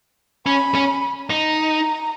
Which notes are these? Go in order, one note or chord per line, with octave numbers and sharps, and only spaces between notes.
C#4 B5
C#4
D#4 A#5